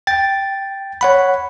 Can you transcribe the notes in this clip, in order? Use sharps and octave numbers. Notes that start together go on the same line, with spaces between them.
G5 A6
C#5 F#5 B5